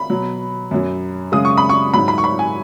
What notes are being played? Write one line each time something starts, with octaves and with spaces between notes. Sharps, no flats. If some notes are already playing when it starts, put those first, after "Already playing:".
Already playing: B5
B2 F#3
F#2 F#3
F#2 C#3 G#3 D#6
C#6
B5
C#6
G#2 F#3 B5
B5
C#6
B5
G#5